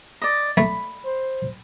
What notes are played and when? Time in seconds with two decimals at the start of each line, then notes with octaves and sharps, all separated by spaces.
0.22 D5 D#5
0.57 A3 B5
1.06 C5